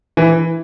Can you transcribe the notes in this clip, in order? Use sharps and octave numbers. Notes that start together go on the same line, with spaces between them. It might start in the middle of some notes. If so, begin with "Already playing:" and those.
E3